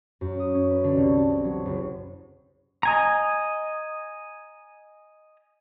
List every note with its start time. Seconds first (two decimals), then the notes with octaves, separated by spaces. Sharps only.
0.21 F#2
0.40 D#6
0.55 C#4
0.71 B4
0.84 D3
0.96 C2
1.17 A5
1.30 C4
1.44 F#3
1.66 F#1
2.83 D#5 G#5 A#5